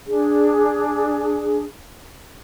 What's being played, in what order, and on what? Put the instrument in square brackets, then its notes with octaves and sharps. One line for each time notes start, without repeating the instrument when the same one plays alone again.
[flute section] D4 G#4